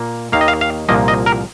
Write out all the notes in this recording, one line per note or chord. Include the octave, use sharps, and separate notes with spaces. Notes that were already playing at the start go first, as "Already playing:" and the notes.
Already playing: A#2 A#3
D#2 D#3 A#3 F5
D#5
F5
F5
C2 A#2 F3 A#3 D#5
D#5
A#4